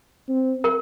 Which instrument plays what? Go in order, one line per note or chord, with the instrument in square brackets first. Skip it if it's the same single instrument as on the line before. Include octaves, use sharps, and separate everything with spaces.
[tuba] C4
[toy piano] A#4